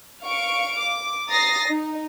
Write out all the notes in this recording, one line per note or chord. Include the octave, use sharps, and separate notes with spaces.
F5 C#6 D7
D6
A#5 D#6 A6 A#6 C7
D#4